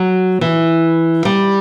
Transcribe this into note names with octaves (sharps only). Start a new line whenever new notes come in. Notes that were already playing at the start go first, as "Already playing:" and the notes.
Already playing: F#3
E3
G3